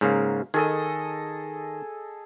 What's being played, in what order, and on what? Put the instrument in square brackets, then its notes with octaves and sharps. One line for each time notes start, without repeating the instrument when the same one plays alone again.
[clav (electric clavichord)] G#2 C#3 A#3
[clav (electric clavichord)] D#3 [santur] G#4 A4 D#5